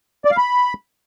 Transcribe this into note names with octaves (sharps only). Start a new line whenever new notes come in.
D5
F5
B5